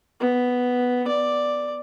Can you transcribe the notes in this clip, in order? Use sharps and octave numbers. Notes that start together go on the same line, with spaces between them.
B3
D5